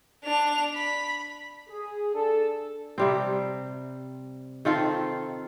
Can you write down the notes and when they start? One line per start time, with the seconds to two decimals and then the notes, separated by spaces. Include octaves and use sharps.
0.24 D4 F7
0.75 B5
1.69 G#4
2.14 D4 A4
2.98 C3 G3 C4
4.65 D#3 C4 F4 A4